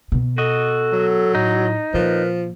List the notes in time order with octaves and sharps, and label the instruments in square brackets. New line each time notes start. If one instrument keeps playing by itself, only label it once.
[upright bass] B2
[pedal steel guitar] F#4 D#5 [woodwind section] A4
[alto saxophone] F#3
[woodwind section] A2 [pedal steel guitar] D#4
[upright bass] A#2 [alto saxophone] F3 [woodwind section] A#4 B4